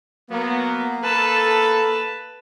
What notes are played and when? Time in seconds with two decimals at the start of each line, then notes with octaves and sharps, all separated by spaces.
0.31 F#3 A#3 B3
1.03 A4 B4 A5